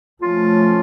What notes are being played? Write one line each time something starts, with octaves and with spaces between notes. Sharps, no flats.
F3 A3 C#4 F4